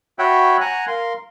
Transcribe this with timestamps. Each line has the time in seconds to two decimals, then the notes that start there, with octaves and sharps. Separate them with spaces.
0.19 F#4 C#5 E5 F#5 G5 B5
0.61 F#5 G#5 A#5 F#6
0.87 A#4 F5 C6